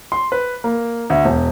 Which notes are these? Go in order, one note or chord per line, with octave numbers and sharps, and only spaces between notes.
C6
B4
A#3
D2
E1